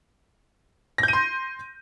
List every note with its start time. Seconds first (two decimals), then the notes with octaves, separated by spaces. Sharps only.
0.98 A#6
1.03 G6
1.08 D#7
1.13 C6